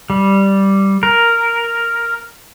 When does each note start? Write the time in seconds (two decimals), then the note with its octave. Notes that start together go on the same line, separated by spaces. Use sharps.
0.10 G3
1.03 A#4